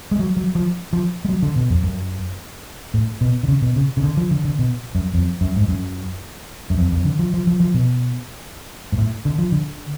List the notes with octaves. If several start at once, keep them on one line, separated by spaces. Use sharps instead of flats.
G#3
F#3
F#3
F3
F3
G#3
F#3
D3
B2
F2
F#2
A2
B2
D3
C#3
B2
C#3
C#3
D3
F3
D3
D3
B2
F#2
F2
F#2
G#2
F#2
F#2
F2
F2
D3
F3
F3
F3
F3
B2
G#2
A2
D3
F3
D3